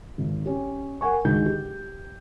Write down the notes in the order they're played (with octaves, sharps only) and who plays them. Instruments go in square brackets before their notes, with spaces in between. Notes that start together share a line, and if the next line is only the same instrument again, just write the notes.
[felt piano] G#1
C#4 G4
A#4 F#5 G#5 C#6
D2 G#2 D#3 G#3 G6
G4